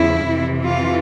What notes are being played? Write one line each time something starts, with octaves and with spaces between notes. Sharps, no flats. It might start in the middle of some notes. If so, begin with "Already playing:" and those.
Already playing: E2 C#3 F3 E4
F2 C3 E3
F4